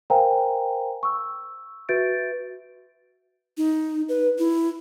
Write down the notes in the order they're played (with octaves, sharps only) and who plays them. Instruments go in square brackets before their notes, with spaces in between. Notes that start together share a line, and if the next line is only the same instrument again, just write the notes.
[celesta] A#4 C5 F5 G5 G#5 A#5
C#6 E6
F#4 B4 E5 G6 A6 D7
[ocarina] D#4
B4
E4